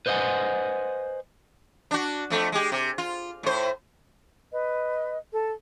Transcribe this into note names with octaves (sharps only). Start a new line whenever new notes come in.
B4 C5 D#5 F5 F#5 G#5
D4 F#4
F2 A3
G#3 G4
C3
F4
A2 C5
B4 D#5
A4